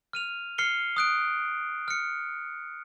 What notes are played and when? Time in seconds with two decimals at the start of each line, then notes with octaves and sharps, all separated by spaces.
0.13 F6 D#7 F7
0.58 F6 C7 C#7 G7
0.97 D#6 F#6 D7
1.88 F6 C#7